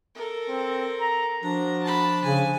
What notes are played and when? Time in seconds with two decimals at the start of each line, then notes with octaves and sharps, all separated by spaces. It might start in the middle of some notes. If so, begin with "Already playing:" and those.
0.15 A4 A#4
0.49 C4
1.00 A#5
1.43 F3 D4 F#4 A#5
1.83 A5 B5
2.24 C#3 G#5